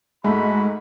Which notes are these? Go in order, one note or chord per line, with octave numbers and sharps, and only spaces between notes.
G#2 G#3 A3 F#4 B5